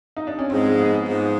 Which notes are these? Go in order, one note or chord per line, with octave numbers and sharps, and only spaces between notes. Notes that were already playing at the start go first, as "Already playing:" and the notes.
D#4
D4
C#4
G#2 F3 G#3 C4
B3
G#2 F3 G#3